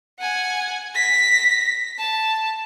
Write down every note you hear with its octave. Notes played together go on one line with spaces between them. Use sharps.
F#5 G#5
A#6 B6
A5